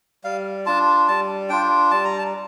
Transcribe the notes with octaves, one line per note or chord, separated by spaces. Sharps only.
G3 F5
D4 F4 A5
G3 A5
D4 F4 G5
G3 A5
A#5
A5